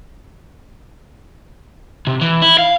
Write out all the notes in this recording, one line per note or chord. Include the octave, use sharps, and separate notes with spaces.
C3
E3
E4
F5